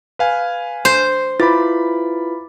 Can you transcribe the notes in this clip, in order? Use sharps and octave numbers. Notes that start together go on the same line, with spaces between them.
B4 F5 G#5
C5
E4 F4 B4 B5 D6 A6